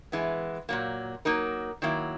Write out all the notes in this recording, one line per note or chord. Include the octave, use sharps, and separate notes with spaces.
E3 G#3 B3
A#2 F#3 A#3
F#3 A#3 D#4 A#4
D#3 F#3 A#3 E4